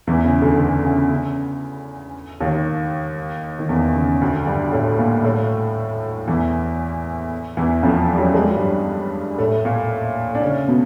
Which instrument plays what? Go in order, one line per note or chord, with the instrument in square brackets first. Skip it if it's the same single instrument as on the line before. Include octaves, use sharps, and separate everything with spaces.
[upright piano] E2 E3
C#3
D2 D3
D2 D3
C#3
C#3
D#2 D#3
D#3
E2 E3
C#3
D2 D3
G2 G3
A2 A3
A#2 A#3
A2 A3
E2 E3
E2 E3
F2 F3
G3
F#2 F#3
G#3
G3
F#3
G2 G3
A2 A3
A#2 A#3
D4
C#3 C#4
B2 B3